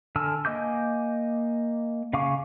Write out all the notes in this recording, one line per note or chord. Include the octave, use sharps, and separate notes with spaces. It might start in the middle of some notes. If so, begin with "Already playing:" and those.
D3 G#5 A5 E6 F6
A#3 D#5 G#5 D6 G6
C#3 F5 G#5 C#6 D6